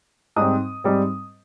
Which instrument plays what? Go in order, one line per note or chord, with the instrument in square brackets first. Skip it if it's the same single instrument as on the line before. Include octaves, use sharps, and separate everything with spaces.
[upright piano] G#2 G3 C4 D#6
G#2 G3 C4